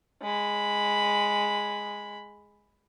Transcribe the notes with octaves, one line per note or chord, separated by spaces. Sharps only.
G#3 B5